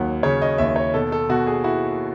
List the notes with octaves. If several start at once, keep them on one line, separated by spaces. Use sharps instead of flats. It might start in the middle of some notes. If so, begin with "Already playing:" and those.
Already playing: D#2 F#3 F#5
C#3 C#5
D#5
D#2 E5
C#5
B2 A4
A4
B2 F#4
G#4
E4 F#4